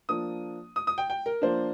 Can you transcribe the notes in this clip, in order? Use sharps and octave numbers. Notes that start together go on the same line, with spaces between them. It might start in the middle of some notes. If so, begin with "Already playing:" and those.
F3 A#3 D4 D#6
D#6
D#6
G5
G5
A#4
F3 A#3 D4 C5